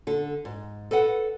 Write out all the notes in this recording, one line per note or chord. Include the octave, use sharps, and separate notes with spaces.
D3 A4
G#2
A4 B4 D#5 F#5